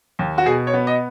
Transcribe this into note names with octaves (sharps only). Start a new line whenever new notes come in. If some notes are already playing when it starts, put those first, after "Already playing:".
D#2
F#4
B2 G#4
C#5
B3
D#5